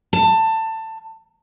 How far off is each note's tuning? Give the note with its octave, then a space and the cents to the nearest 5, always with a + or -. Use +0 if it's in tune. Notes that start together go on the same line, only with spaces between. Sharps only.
A5 +20